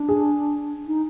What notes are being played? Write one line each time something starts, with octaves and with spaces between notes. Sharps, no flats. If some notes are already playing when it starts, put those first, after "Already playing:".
Already playing: D4
G#4
D#4